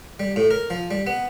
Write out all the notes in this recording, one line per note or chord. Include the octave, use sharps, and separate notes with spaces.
G3
A2
A#4
F3
G3
B3